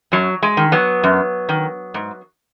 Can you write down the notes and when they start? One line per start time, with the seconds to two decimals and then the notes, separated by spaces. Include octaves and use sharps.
0.12 F#2 F#3
0.43 G#3
0.57 D#3
0.72 F#3 B3
1.04 F#2
1.49 D#3
1.94 G#2